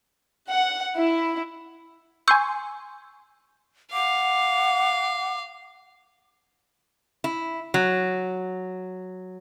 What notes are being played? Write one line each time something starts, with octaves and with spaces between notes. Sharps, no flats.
F#5
E4
G#5 C6 C#6 E6 G6
F5 F#5 D6
E4
F#3